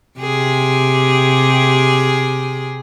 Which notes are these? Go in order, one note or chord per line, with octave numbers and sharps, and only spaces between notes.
C3 G4 G#4